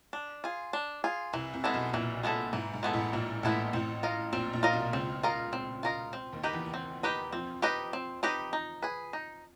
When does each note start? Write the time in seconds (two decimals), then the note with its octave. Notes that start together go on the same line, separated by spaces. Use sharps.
0.13 D4
0.44 F4 G#4
0.73 D4
1.04 F4 G#4
1.33 C2 C3 E3
1.54 C2 C3
1.64 G#3 B3 E4 A4
1.73 B1 B2
1.93 A#1 A#2 E3
2.23 G#3 B3 E4 A4
2.53 G#2 E3
2.74 G#2
2.83 G#3 B3 E4 A4
2.93 A1 A2
3.13 A#1 A#2 E3
3.43 A1 A2 G#3 B3 E4 A4
3.73 A1 A2 C4
4.03 F4 A#4 D#5
4.33 A#1 A#2 C4
4.53 A#1 A#2
4.63 F4 A#4 D#5
4.73 B1 B2
4.93 C#2 C#3 C4
5.23 F4 A#4 D#5
5.53 C4
5.83 F4 A#4 D#5
6.13 C4
6.32 D#2 D#3
6.43 D#4 G4 B4 D#5
6.53 E2 E3
6.74 C4
7.03 D#4 G4 B4 D#5
7.33 F2 F3 C4
7.62 D#4 G4 B4 D#5
7.93 C4
8.23 D#4 G4 B4 D#5
8.53 D#4
8.82 G#4 B4
9.13 D#4